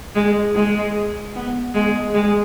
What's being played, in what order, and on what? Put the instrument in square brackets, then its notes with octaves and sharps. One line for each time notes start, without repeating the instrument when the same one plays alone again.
[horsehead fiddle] G#3
G#3
B3
G#3
G#3